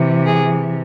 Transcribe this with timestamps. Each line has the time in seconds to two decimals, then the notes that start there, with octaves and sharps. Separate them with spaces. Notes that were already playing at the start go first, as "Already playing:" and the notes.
Already playing: C3 E3
0.26 G#4